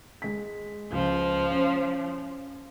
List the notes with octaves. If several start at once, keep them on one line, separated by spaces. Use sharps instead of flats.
G#3 B6
C#2 F3
C#4